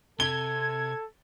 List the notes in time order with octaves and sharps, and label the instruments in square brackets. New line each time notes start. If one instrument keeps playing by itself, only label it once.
[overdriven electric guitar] C3 [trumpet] A4 [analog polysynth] G#6 [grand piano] G7